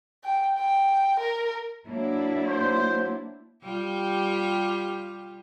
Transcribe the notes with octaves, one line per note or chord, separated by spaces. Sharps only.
G5
G5
A#4
F#3 A#3 D4 E4
C5
G3 F4 G4